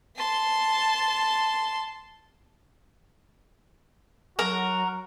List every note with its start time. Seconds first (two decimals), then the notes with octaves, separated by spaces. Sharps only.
0.17 A5 C6
4.39 F#3 F#4 A#4